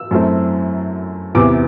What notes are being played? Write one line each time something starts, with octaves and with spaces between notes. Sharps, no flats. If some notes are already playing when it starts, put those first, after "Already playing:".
Already playing: E6
F#2 F#3 A3 C4 E4
E2 C3 E3 B3 D6